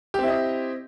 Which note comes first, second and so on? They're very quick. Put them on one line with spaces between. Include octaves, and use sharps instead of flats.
G4 C4 E4 D#5